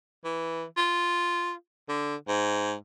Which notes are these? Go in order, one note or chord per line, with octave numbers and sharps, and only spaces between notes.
E3
F4
D3
G#2